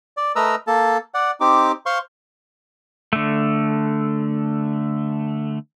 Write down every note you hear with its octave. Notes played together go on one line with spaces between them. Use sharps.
D5
A3 A#4 B4 D#5 A#5 E6
A#3 A4 A5
D5 F#5
C4 D#4 G4 D6
C5 F5 C6 C#6
D3 A3